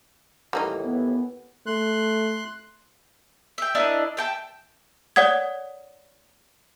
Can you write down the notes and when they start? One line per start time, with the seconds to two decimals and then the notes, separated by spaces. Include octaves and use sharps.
0.53 D#2 A2 E3 G3 A#3 D#4
0.84 B3
1.66 A3 C6 F#6
3.58 E5 G5
3.75 D4 E4 A#4 D#5
4.17 E5 G5 A5
5.16 C#5 D5 F#5 D#6 G#6